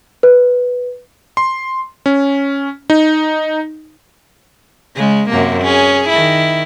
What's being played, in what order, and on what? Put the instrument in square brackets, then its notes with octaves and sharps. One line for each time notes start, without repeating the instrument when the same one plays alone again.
[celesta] B4
[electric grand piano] C6
C#4
D#4
[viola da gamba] C#3 G#3
F#2 C3 A#3
C#4 G#4
D#3 E4